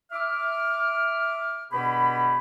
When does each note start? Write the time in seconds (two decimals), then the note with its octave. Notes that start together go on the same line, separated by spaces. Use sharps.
0.12 E5 D6 F6
1.71 G2 B2 B3 G4 G#4 B5